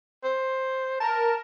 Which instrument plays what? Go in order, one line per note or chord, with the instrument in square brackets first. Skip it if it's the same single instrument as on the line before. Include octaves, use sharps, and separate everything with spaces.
[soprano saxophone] C5
[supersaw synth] A#4 [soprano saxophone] A5